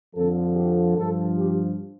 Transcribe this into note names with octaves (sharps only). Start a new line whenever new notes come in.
F2 D3 F3 A4
G4
G2 F3 A4
G4